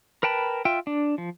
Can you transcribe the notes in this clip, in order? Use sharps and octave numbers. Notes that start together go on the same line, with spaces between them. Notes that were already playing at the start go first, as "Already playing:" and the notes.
A#4 B4 G5 A5 B5
F4 E5 G5
D4
F3